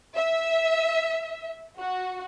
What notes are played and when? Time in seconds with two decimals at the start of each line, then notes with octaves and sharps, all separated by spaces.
0.16 E5
1.79 F#4